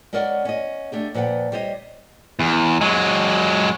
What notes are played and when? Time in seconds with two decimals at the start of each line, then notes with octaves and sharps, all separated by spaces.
0.13 G#3 C#4 A#4 D5 D#5 F#5
0.45 C#4 D#5
0.92 A3 D4 G4 G#4
1.14 A#2 F3 B4 F#5 G5
1.52 G3 G4 C5 C#5 D#5
2.39 E2
2.81 F#3 G#3